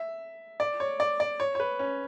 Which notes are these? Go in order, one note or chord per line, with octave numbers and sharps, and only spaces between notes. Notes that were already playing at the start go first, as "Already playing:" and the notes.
Already playing: E5
D5
C#5
D5
D5
C#5
C#5
B4
C#4